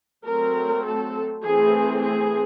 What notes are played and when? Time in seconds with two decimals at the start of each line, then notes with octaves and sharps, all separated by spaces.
0.25 F#3 A3 C4 A#4
0.84 A4
1.44 E3 A3 C4 G#4
2.03 G#4